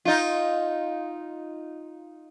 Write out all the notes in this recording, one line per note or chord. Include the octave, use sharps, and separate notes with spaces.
D#4 F4